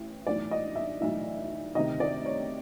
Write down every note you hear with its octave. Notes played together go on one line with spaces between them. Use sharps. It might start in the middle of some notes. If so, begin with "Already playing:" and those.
Already playing: A1 A2
B1 A2 E3 D5
D#5
E5
B1 A2 E3 E5
D2 C3 D#3 D#5
D5
C#5